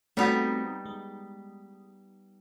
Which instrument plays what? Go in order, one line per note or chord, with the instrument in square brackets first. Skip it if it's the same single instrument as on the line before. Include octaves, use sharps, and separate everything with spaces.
[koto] G3 B3 D#4 [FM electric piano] A3 C4 F#4
[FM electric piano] G#3